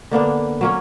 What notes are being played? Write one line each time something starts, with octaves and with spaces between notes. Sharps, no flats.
D3 A#3 B3 D4
F#3 A#3 C#4